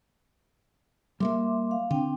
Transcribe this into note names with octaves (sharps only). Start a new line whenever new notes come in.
G3 G#3 A#3 E5 C6 D6
F5
D3 C4 D4 G5